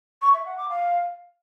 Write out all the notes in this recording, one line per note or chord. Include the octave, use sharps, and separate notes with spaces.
C#6
E5
F#5
D6
F5